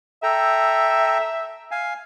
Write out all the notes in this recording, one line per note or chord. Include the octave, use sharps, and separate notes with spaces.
A4 E5 G5 A#5
F5 G#5